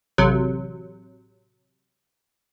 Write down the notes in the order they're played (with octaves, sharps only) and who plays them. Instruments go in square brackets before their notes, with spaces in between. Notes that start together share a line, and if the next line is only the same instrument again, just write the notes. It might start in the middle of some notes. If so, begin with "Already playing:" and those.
[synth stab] A1 C3 F#3